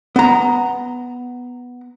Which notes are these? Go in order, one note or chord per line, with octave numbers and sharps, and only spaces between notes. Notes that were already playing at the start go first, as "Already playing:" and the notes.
B3 A#5